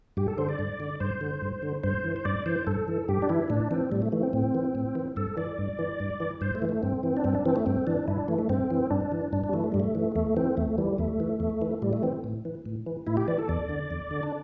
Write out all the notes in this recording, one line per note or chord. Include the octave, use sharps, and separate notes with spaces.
G2 G4
A4
D3 C5
D5
G2
D3
G2 C5
D3
G2
D3
G2 C5
E3
C5
G2 D5
E3 C5
G2 A4
E3
G2 G4
D4
E3 E4
A2 D4
E3 C4
A2 G3
A3
E3 A3
C4
A2 C4
E3
A2
E3
G2 A4
E3 D5
G2
E3
G2
E3
G2 C5
A3
E3
A3
G2 C4
E3
D4
G2 C4
D4
E3 C4
A3
G2 C4
E3 D4
G2 E4
D4
E3 A3
A3
G2 C4
E3
G2 D4
E3
G2 D4
D4
G3
E3 A3
A3
G2 G3
A3
E3
E2 A3
E3 C4
E2 A3
E3 G3
E2 A3
E3
E2
E3
A2 G3
A3
E3 C4
A2
E3
A2
E3
A2 E4
G4
E3 D5
A4
E2 D5
D3
E2
D3
D4